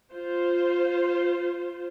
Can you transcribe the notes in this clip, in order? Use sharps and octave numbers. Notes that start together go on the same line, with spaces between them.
F4 C5